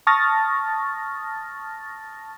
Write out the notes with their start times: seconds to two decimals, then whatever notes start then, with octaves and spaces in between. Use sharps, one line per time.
0.07 A5 C#6 D#6 F6 A6 A#6